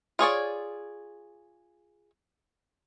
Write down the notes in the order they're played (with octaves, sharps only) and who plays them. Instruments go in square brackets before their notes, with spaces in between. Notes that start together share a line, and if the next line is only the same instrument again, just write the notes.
[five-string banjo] F4 G#4 C#5 D5